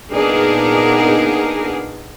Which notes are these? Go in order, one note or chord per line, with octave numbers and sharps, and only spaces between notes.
A#2 B3 D4 D#4 G#4 A#4